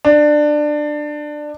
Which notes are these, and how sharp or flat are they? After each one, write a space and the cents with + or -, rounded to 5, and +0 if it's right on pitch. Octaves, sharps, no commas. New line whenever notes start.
D4 +20